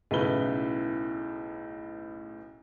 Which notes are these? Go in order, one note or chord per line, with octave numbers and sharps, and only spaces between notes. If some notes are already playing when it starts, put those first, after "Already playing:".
B1 A2 C#3 E4 B4 G7